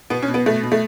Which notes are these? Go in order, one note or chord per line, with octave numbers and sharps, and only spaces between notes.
B2 B3
C#4
B2
B3
B2 A3
B2
A3